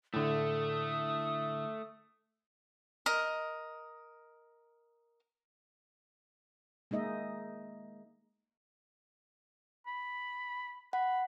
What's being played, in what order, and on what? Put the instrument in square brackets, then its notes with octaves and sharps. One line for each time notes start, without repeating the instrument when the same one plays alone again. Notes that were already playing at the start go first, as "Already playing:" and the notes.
[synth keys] A2 D3 [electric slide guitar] A3 [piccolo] D#6
[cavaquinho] A#4 D#5
[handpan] G#3 A#3 D#4 D#5 E5
[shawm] B5
[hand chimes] F#5 [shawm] B5